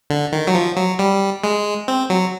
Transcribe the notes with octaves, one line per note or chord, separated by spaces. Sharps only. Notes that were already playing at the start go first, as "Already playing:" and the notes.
D3
D#3
F#3
F3
F#3
G3
G#3
C4
F#3